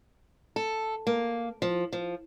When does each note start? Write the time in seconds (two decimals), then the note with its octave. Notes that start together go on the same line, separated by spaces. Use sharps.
0.56 A4
1.07 A#3
1.62 F3
1.92 F3